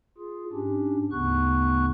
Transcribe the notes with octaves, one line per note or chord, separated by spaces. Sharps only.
F4 G#4
G#2 C#4 D4 G4
D2 G#2 C#3 B3 C#6 F#6